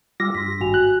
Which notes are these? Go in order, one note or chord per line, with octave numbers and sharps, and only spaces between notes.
G3 F4 D6 E6 A#6
G2 C6 B6
G#1 F#4 G#5 F7
F#6